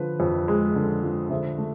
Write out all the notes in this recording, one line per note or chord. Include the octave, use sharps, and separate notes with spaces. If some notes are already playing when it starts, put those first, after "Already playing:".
Already playing: D3 F3 B4
F2
G#3
D3
F3
D3 C5 E5
A3